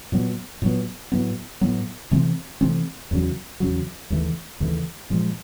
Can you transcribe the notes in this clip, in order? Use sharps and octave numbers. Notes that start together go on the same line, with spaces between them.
A#2 F#3 B3
A#2 F#3 B3
A2 F#3 B3
A2 F#3 B3
C3 E3 A3 C4
C3 E3 A3 C4
E2 C#3 F#3
E2 C#3 F#3
D#2 C#3 E3 A3
D#2 C#3 E3 A3
A#2 F3 G#3